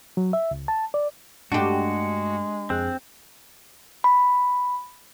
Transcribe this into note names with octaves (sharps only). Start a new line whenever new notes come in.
F#3
E5
C#2
A5
D5
G2 G#3 A3 D4 F#4 G4
F2 C4 G#4 F#6
B5